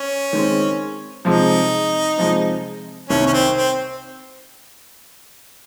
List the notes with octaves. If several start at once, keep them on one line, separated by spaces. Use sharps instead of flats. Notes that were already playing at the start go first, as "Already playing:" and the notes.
Already playing: C#4
D#3 G#3 C4
C3 F3 G#3 D#4
C3 F3 G#3
C2 C3 D#3 C#4
C#4
C4
C4